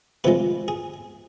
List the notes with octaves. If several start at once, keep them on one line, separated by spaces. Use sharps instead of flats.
C3 F3 G#3 B4
G#4